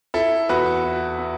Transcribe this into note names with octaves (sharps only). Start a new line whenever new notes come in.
E4 A4
E2 F#4 B4
E4
E4